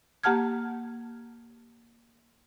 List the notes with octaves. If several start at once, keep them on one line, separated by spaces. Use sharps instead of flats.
A#3 G4 F#5 A5 F6 G#6